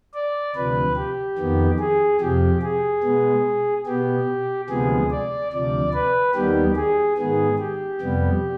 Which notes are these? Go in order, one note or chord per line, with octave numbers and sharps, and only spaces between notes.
D5
D2 C3 F3 B4
G4
F2 D#3 B3
G#4
F2 C3 F3 G4
G#4
B2 G#3 B3
B2 B3 G4
D2 C3 F3 G#3 B3 G#4
D5
D2 C3 F3 D5
B4
D#2 D#3 G3 B3 G4
G#4
G#2 D#3 B3 G#4
G4
F2 C3 G3 B3